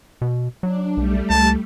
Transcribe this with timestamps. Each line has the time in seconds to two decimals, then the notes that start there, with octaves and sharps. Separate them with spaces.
0.21 B2
0.63 F#3 D4
0.97 B1 G3 A3
1.30 C#2 A5